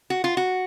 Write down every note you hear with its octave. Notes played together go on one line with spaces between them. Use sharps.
F#4
F4
F#4